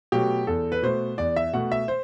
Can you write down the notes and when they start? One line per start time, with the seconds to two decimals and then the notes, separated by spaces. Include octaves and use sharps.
0.12 B2 F#3 A3 G4
0.47 E2 A4
0.72 B4
0.82 B2 A3 C5
1.18 E2 D5
1.36 E5
1.53 B2 A3 F#5
1.72 E5
1.88 C5